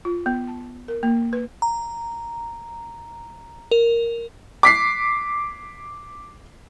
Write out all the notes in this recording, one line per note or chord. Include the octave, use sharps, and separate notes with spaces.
F4
B3
A5
A#4
A#3
B4
A#5
A#4
D6 B6 C7